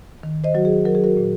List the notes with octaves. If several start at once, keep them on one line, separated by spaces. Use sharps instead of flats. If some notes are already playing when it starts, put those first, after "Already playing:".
D#3
C5 D#5
F#3 F#4
G#4
F#3 A#4
G#4
F#4 A#4
A#2